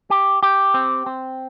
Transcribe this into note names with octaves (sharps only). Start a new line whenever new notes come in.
G4
G4
C4
C4